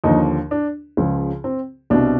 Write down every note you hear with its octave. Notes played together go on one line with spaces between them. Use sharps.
D#2 D3 F3 D#4
D4
C#2 C#3 F3
C4
C2 B2 D4